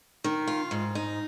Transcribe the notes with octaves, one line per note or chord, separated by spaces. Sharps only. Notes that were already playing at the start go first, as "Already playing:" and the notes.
D#3
F4
G#2
D#4